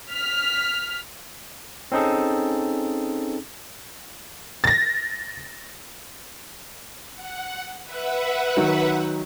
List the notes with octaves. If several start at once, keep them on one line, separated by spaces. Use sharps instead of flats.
F6 B6
C4 C#4 D#4 G#4 A4
A6 A#6
F#5
B4 E5 F#5
D#3 F#3